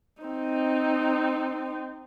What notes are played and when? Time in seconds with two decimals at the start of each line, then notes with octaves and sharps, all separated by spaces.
0.22 C4 D#4